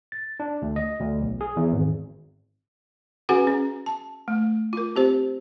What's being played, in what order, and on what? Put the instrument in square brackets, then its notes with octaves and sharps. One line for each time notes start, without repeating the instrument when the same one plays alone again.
[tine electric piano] A6
D4
D2
D#5
D2
B1
G#4
E2
G#1
[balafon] C#4 F#4 G#4 B4 F#5 G#5
C#4
A5
A3
F4 A#4
C4 G4 C5